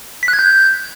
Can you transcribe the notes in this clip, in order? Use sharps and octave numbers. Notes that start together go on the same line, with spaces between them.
B6
F#6
G#6
G6